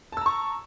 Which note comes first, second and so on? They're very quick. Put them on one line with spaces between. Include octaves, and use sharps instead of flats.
A5 E6 A#5 C#6